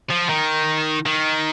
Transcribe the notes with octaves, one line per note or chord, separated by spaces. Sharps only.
F3
D#3
D#3